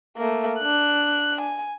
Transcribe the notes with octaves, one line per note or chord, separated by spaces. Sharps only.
A3 A#3
D4 F#6
G#5